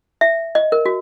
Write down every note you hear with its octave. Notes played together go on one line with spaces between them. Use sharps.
E5
D#5
A#4
F#4